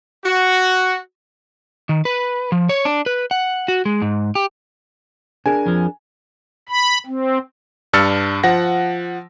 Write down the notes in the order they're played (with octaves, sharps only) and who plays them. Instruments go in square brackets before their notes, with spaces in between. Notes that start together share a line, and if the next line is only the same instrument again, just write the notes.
[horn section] F#4
[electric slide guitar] D#3
B4
F3
C#5
D4
B4
F#5
F#4
G#3
G#2
G4
[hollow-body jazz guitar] D4 G#4 A#4 [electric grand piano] G#5
[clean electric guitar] F2 F3
[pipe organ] B5
C4
[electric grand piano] G2 D4 E6 F6 A6 C#7
F3 F#5 A#6